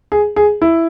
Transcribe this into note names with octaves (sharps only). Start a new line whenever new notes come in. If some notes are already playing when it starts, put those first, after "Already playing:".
G#4
G#4
E4